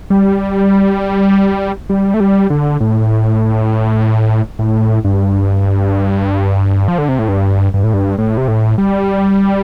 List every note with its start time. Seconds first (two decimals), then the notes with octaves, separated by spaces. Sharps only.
0.10 G3
1.89 G3
2.14 A3
2.20 G3
2.50 D3
2.80 A2
4.59 A2
5.05 G2
6.88 F3
6.98 D3
7.09 C3
7.19 A2
7.29 G2
7.74 G2
7.84 A2
7.94 G2
8.18 A2
8.37 C3
8.48 A2
8.78 G3